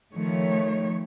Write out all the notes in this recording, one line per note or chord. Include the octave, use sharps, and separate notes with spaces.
D#3 F3 A3 C#5